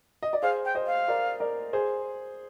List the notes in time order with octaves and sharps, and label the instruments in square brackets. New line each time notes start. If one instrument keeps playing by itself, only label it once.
[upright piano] D#5
D5
[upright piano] G#4 C5 [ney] F5
[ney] G5
[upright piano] C5 D#5
[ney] F5
[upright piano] A#4 D5
A#4 D5
G#4 C5